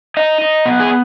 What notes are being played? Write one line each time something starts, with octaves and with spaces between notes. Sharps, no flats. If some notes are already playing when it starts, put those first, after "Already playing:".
D#4 D#5
D#4
B3
G#4